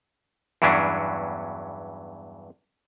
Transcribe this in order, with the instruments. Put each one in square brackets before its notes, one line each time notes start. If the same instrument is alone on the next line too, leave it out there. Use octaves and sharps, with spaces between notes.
[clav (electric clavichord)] E2 G2 E3 F#3 C#4 D4